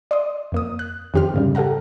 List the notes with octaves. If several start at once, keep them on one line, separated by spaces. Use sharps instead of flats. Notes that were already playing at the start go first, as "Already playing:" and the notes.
D5 C6 D#6
F2 A#3 D#6
F#6
F2 D#3 G4 C5 F6
G#2 C#3 G3
G4 A4 F5 F#5 A#5